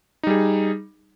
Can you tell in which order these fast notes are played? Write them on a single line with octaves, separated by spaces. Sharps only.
D#4 G3 G#4